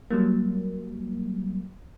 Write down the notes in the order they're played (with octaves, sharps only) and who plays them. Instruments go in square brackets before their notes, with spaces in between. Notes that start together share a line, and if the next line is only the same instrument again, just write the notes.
[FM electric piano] F#3 G3 A#3